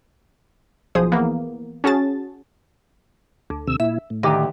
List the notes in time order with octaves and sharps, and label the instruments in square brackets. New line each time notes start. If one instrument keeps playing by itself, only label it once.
[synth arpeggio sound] B1 F3 G#4 C5 D#6
E3 A#3 B3
C#4 F#4 G#4 A5 A6
[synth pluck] D2
[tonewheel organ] D#2 C3 E6
[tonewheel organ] A#2 E4 [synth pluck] E5
[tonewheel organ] A2
[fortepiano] D2 G4 D6 [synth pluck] D#3